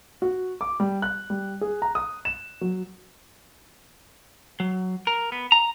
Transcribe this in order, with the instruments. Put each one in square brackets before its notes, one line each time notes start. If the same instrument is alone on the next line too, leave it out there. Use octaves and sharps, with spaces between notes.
[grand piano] F#4
D6
G3
F#6
G3
G#4
A#5
D#6
E7
F#3
[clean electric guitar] F#3
A#4
B3
A#5